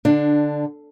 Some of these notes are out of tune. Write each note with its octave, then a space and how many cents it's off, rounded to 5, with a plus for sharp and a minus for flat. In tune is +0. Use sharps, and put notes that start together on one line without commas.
D3 +0 D4 +15